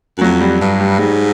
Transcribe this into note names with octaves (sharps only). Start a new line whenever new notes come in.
F#2
F2 F#3
G3
G2
G3
G#2 G3